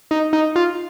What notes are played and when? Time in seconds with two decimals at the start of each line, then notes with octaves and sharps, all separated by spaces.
0.11 D#4
0.33 D#4
0.56 F4